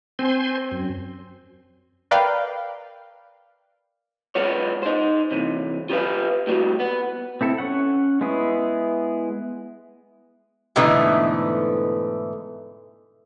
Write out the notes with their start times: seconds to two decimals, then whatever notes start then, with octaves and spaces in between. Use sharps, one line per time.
0.19 C4 C5 G#5 C6
0.71 F#2
2.11 A#4 B4 D5 F5 G5
4.35 G#3 B3 F4 C#5
4.83 D#4 C5
5.31 C3 E3
5.89 F4 G4 A#4 B4 F5
6.47 A2 G3 F#4
6.80 B3
7.41 C4 E4 A4
7.58 C#4 F#5
8.21 G#3 B3 E4 G#4
10.76 G#2 B2 D3 E3 A3 B3